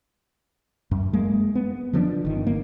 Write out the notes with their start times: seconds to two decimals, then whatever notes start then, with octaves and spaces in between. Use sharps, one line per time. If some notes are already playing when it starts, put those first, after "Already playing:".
0.91 F#2
1.13 G#3 A#3
1.55 B3
1.93 D3 F3 B3 D4
2.25 G1 D#3
2.47 A#3